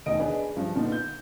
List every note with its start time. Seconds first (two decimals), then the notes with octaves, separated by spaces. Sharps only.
0.06 E1 D2 D#3 D#5 D7
0.19 D4 G#4 B4 D#5
0.56 G2 F3
0.75 A#2 D3 B3 D#4
0.92 G6